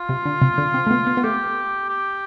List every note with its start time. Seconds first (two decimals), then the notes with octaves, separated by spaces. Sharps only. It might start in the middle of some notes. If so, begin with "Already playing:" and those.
Already playing: F4
0.09 C3
0.26 D3
0.42 C3
0.58 D3
0.74 C4
0.87 A3
0.91 B3
1.07 B3
1.17 B3
1.24 A3 G4
1.89 G4